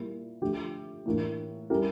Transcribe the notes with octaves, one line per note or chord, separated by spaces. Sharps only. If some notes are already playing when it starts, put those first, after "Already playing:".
Already playing: A#2 G3 A#3 E4
D3 F3 A3 D4 G4
A2 E3 A#3 D4
G3 C#4 E4 G4 A#4